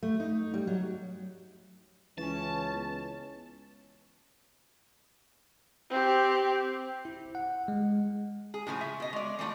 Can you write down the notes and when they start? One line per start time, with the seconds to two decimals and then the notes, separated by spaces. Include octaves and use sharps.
0.03 A3
0.20 D#4
0.54 G3
0.67 F#3
2.18 C#2 E3 C#4 A5
2.76 B3
5.90 C4 G4
7.05 E4
7.35 F#5
7.68 G#3
8.54 G#4
8.67 A2 C#3 F3 G#5
8.81 E5
9.00 B2 D#5
9.13 G#3 D5
9.39 E3 F3 A3 F4